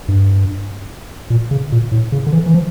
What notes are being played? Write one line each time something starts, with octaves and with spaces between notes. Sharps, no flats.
G2
A#2
C#3
A#2
A2
C#3
D3
E3
E3
F3